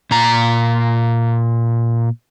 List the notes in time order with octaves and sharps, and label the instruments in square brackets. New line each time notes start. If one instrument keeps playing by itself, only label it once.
[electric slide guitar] A#2 A#5